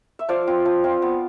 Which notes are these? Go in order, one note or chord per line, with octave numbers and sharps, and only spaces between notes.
E5
F3 D5 F5
C4 F4
F3
C4 F4
B3